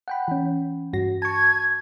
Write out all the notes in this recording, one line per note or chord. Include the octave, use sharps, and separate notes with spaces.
F#5 G5 B5
E3 C#4
G2 F#4 A#6
A5 C#6 G#6